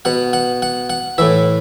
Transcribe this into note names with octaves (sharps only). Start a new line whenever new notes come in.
B2 F#5
F#5
F#5
F#5
A2 E3 E5